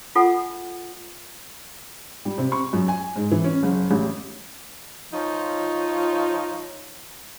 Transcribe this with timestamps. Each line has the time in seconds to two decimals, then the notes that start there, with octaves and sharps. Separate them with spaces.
0.15 F4 A4 F#5 G#5
2.25 G3
2.38 C3
2.52 C#6
2.73 F#2
2.88 G#5
3.16 G#2
3.31 E3
3.44 C#4
3.63 F#1
3.91 A1
5.13 F3 D#4 F4 C#5